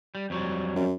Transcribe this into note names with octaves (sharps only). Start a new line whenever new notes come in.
G3
F2 F#3 G3
F#2